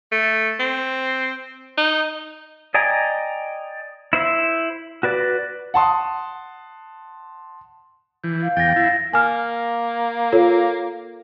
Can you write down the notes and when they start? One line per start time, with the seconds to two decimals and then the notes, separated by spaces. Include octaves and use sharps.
0.12 A3
0.59 C4
1.78 D#4
2.74 D5 D#5 G5 G#5 A#5
4.13 E4 C5 E5
5.03 F#4 B4 D5
5.74 F#5 A5 C6 D#6
8.24 E3 G6
8.43 F5
8.57 E2 G5 A6 A#6
8.76 E4 A6 C7
9.13 A#3 G#5 F6
10.32 F4 A4 C#5